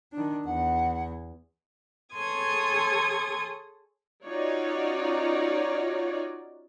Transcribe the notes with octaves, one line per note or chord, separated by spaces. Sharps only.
D#3 D4
E2 F#5
G#4 A4 C#5 C6 D#6 G#6
C#4 D#4 F4 F#4 C#5 D5